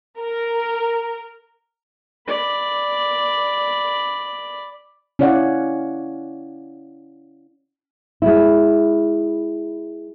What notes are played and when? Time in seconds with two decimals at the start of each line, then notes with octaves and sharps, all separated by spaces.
0.20 A#4
2.27 D5 B5
5.19 C#4 E4 C#5 D5 F5 F#5
8.22 G#3 E4